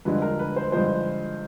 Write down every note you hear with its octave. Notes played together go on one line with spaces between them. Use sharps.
G2 D3 F3 G#3 B4
A#4
B4
C5
G2 D3 F3 G#3 C5